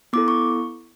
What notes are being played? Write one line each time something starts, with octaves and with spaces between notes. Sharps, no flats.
B3 E4 A4 D6
C#6